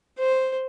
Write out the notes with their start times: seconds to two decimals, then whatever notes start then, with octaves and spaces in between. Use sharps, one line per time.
0.19 C5